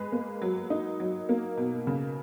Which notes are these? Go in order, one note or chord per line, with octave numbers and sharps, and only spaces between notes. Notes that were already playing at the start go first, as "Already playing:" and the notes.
Already playing: G#3 B4
A#3
F#3
D#4
F#3
A#3
B2
C#3